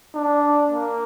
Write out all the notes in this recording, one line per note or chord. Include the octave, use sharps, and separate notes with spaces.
D4
A#3